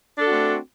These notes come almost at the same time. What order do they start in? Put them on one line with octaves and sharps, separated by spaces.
D4 A4 F#4 C4 A3